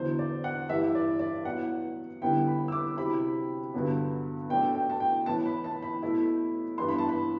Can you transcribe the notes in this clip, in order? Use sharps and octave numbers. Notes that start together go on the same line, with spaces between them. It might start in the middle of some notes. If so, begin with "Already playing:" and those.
Already playing: E2 D3 F#3 C5
D5
F#5
G2 E3 G3 E5
D5
D5
A2 F#3 B3 F#5
D3 G3 B3 E4 G5
B5
E6
D6
C3 F#3 C4 E4 B5
G2 D3 F#3 B3
B2 F#3 A3 D4 G5
G5
A5
G5
A2 E3 B3 A5
B5
A5
B5
B2 A3 E4
G2 E3 B3 D4 C6
B5
A5
B5